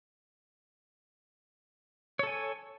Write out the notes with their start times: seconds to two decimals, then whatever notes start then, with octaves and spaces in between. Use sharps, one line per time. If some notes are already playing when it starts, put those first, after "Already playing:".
2.19 C#5
2.23 A4
2.27 G#5